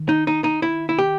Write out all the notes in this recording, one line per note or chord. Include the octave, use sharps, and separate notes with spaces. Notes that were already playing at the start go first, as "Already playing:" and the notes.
Already playing: D#3
D#4
D#4
D#4
E4
E4
G4